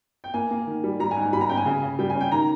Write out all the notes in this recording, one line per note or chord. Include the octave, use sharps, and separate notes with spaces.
G5
A#3 G#5
A#3
D#3
G3
G3 A#5
G#5
G#2
G#5
G3 B5
A#5
C#4 G5
G#5
C#3
C#3
G3 G5
G#5
C#4
G5
D#3 A#5